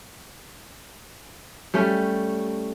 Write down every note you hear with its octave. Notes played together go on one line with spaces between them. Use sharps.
G3 A3 C#4